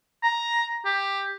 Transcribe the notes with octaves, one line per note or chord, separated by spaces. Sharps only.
A#5
G4